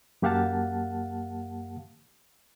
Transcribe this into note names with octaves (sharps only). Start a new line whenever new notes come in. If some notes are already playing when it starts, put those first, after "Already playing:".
F#2 A#3 G4 F5 F#5 A5